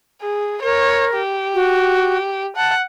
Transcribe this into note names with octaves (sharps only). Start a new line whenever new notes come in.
G#4
A#4 C#5
G4
F#4
F#5 A5